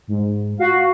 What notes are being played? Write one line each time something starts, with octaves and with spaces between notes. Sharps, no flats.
G#2
F#4 F5